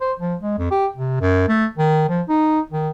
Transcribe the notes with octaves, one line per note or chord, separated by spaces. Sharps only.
C5
F3
G#3
F2
G4
C3
F#2
A3
D#3
F3
D#4
D#3